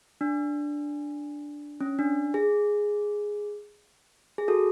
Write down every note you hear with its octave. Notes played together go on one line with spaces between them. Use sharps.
D4
C#4
D4
G#4
G#4
F#4 A4